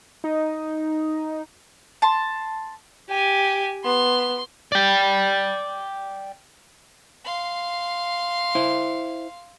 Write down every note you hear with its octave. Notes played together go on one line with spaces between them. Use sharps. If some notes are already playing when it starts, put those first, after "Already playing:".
D#4
A5 C6
G4 G#5
B3 C6
D5 G5
F5 C6
E4 C5